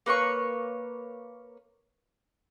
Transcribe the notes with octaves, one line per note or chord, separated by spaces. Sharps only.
A#3 B4 C#5 C#6